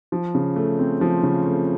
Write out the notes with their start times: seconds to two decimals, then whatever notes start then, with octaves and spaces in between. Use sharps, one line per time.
0.12 F3
0.35 C#3
0.56 A3
0.79 C4
1.01 F3
1.23 C#3
1.46 A3